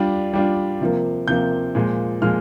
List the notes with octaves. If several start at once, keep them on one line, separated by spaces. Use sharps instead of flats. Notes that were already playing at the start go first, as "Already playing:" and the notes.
Already playing: G3 D4 F4
G3 D4 F4
C3 F3 A#3
C3 F3 A#3 G6
A#2 F3 G#3
A#2 F3 G#3 F6